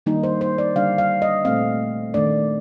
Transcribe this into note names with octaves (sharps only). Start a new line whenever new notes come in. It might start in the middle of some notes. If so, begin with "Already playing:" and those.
D#3 G3 A#3 D4 D#4
C5
C5
D5
D3 G3 D4 F5
F5
D#5
A#2 A3 C4 F5
D#3 A3 D4 D5